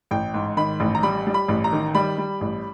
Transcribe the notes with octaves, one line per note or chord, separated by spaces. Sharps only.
A1 G5
G#2
D#3 B5
A1
A#5
G3 B5
G3
B5
A1
A#5
D#3
G3 B5
G3
A1